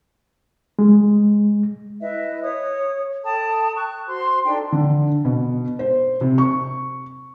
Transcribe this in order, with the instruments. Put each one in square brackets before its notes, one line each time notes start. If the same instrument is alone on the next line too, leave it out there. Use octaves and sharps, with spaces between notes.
[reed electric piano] G#3
[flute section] E4 B4 D#5 E5
C#5 D#6
A4 G5 A5 D#6
C#6 F#6
F#4 C5 C6
D4 D#4 A4 G5
[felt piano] D3
B2
C5
C3
C#6